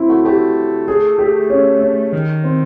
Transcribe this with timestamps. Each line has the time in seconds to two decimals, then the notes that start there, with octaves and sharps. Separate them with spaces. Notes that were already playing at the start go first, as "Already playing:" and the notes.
Already playing: C4 E4
0.09 A3 F#4
0.24 A3 G4
0.88 G#4
1.18 G4
1.50 C#4
1.81 C#4
2.13 D#3
2.44 C4